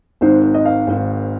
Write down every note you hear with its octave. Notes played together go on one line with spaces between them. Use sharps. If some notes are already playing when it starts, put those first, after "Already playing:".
G#1 G#2 D#3 C5
D#5
F5
G#1 G#2 D#3